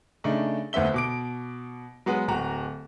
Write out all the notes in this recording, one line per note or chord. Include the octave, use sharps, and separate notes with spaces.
C#3 A3 D4 D#4
G1 D2 B3 C4 E5 G7
B2 D6 D7
F#3 G#3 B3
D1 F#4 A#5